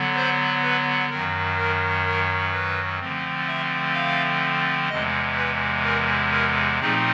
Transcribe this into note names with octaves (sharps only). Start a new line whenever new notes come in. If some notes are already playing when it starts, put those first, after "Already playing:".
Already playing: D3 F#3 B3
C5
B4
F#2 D#3 F#3 A#4
A#4
A#4
B4
D3 F3 A3 C4
E5
F5
E2 C3 E3 G#3 D#5
B4
A#4
A#4
A#2 F3 A3 C4 D#4 G#4